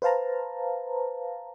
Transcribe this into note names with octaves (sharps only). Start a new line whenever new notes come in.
B4 C5 F5 A5 A#5